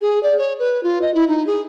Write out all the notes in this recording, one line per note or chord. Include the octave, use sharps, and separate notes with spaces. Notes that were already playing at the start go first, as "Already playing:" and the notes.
G#4
D5
C#5
B4
F4
D#5
E4
D#4
G#4